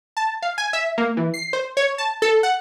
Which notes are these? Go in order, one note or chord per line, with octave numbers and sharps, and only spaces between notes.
A5
F5
G#5
E5
A#3
E3
C7
C5
C#5
A5
A4
F#5